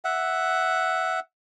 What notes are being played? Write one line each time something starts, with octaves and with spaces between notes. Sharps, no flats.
E5 F#5